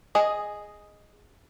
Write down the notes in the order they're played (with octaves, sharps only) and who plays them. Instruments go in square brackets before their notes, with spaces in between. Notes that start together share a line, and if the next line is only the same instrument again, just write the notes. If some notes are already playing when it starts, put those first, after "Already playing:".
[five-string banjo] G#4 D#5